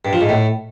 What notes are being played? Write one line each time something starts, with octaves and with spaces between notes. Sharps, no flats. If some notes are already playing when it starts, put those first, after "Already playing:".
G2
F3
G#2
A2